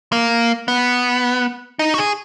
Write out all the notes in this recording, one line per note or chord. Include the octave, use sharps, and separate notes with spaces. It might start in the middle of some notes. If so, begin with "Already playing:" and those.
A#3
B3
D#4
F#4
G#4